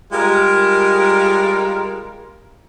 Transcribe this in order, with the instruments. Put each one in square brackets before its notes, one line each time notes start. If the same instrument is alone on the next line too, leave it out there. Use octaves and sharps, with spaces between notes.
[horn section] G3 G#3 F4 A#4